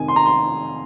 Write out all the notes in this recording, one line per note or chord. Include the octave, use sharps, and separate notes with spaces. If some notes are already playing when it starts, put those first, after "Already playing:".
Already playing: F1 F2 D#3 G#5
C6
A#5
C6